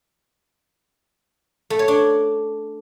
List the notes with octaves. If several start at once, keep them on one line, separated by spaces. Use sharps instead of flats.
A3
C#5
D4